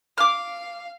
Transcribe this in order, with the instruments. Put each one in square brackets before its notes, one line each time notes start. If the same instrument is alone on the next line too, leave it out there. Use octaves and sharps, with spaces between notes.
[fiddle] F5 [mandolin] D6 F6